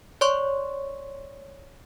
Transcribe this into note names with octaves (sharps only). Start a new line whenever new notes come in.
C#5 D5 C6 C#6